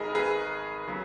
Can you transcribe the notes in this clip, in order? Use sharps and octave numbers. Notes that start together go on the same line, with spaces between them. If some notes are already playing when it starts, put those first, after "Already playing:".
Already playing: G#1 G#2 D#3 G#4 A#4 B4 D#5
G#4 B4
C#3 F#3